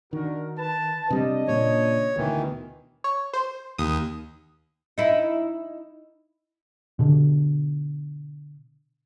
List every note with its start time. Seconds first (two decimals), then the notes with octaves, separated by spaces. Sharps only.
0.13 D#3 D4 F#4 A#4
0.57 B4 A5
1.10 C3 G3 D4 D#5
1.47 A#2 C#3 C#5
2.17 D2 B2 D#3 E3
3.04 C#5
3.33 C5
3.78 D#2 D#6
4.98 D#4 E4
6.99 B2 D3